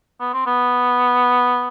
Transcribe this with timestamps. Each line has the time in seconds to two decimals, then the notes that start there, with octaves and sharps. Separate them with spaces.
0.20 B3
0.33 C4
0.46 B3